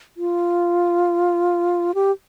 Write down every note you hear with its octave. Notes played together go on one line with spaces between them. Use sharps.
F4
G4